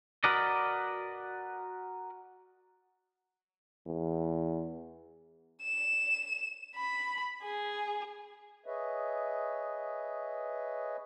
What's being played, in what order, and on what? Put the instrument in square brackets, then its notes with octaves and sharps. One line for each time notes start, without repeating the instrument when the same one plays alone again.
[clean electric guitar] F#4 A#4 B4 D5 D#5
[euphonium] E2
[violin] E7
B5
G#4
[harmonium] G#4 B4 C#5 D#5 E5